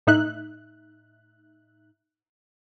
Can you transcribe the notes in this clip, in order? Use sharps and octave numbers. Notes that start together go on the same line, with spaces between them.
A2 D#4 E5 F#6